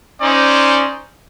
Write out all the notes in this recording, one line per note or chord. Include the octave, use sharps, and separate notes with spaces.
C#4 D#4 C5 D5